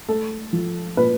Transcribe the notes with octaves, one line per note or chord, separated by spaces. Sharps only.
A3 A4
F3
A#2 B4